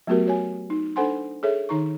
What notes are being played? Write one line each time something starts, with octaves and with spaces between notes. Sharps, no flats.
F#3 A3 B3 F#4 G4 A#4
F#4 C#5 G#5
D#4
D4 A4 C5 F#5 G#5 C6
G#4 A4 C#5 E5
D#3 D#4 A#5 C#6